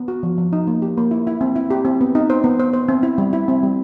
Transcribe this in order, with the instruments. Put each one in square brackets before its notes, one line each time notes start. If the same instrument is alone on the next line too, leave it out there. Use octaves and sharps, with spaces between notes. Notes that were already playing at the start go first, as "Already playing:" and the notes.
Already playing: [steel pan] B3
F#4
F3
F3
D#4
A#3
G4
A#3
E4
E4
C4
E4
G4
C4
B3
D#4
C5
B3
C5
C5
C4
E4
G3
E4
C4
G3